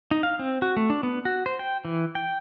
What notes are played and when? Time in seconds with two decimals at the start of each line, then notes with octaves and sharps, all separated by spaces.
0.11 D#4
0.23 F5
0.39 C4
0.62 F#4
0.77 A3
0.90 D4
1.03 B3
1.25 F#4
1.46 C5
1.59 G5
1.85 E3
2.15 G5